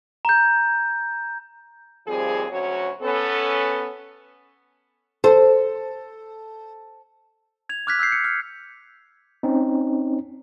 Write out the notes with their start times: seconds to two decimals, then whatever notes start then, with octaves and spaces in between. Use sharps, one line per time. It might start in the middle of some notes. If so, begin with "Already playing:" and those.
0.25 A#5 G6
2.07 D#2 F3 G3 C4 G#4
2.51 D2 F#3 C#4 F#4 C#5
3.02 B3 C#4 A4
5.24 A4 C5
7.69 G#6 F7
7.87 D6 F6 F#6 G#6 B6
7.99 E6 F#6 G6 C7
8.12 C#7
8.24 F6
9.43 C4 C#4 D#4